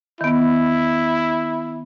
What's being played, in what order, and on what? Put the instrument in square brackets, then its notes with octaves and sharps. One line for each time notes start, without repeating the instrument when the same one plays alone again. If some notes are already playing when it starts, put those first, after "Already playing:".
[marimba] D#3 B3 [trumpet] E4